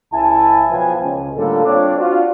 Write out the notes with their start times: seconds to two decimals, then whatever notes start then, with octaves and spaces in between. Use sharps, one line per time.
0.12 C#2 E4 G#5 A5
0.69 B1 F3 B4 G5 G#5
1.02 C#2
1.35 A2 D3 G3 A#3 F4 A4
1.64 C4 D4 F4 C#5 D5
1.98 D4 F4 F#4